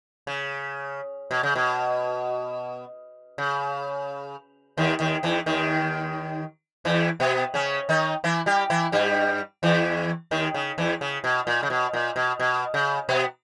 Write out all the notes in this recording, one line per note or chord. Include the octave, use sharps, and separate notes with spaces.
C#3
B2
C#3
B2
C#3
D#2 D#3
D#2 D#3
E2 E3
D#2 D#3
E2 E3
B2 B3
C#3 C#4
D#3 D#4
E3 E4
G3 G4
E3 E4
G2 G3
E2 E3
D#2 D#3
C#3
E2 E3
C#3
B2
A#2
C#3
B2
A#2
B2
B2
C#3
B2 B3